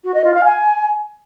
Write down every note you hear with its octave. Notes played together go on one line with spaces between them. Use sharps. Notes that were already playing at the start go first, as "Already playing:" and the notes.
F#4
D#5
F4
F5
G#5